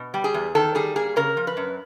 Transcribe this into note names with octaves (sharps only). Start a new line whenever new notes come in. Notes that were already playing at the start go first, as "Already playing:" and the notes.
Already playing: B2
G3
G#4
E2
D#3 A4
G3 G#4
A#3 G#4
C#3 A#4
F3
B4
F#2